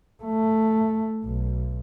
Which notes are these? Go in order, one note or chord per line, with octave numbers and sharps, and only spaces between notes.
A3
B1